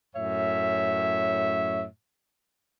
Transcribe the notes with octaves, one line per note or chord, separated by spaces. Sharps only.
F#2 A2 C#5 E5